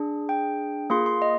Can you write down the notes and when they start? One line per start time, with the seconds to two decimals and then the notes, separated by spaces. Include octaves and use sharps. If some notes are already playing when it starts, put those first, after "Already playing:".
Already playing: D4 G#4
0.29 G5
0.90 A#3 F4 G#4 C6
1.06 C6
1.22 D#5